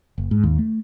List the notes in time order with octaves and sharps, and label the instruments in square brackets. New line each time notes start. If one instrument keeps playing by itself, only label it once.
[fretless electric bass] F#1
G#2
D#2
A3